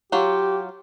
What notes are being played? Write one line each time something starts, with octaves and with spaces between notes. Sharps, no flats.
F#3 F4 G4